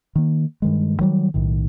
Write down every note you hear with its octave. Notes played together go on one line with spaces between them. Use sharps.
D#3 A#3
G2 D#3 G#3
D#3 F#3 G3
B1 A2 D#3